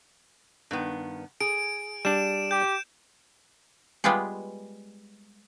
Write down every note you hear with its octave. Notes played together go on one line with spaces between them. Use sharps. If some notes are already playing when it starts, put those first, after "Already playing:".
G2 D#3 B3
G#4 D7
G3 D4 E7
G4 G6
G3 G#3 B3 F4 G4 G#4